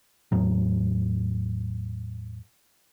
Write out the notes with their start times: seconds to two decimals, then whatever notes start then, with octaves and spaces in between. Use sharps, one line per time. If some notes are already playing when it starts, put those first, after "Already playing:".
0.32 E2 A2 F#3